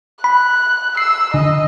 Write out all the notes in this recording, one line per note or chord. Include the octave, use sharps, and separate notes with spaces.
B5 F#6
E6 C7
D3 D#5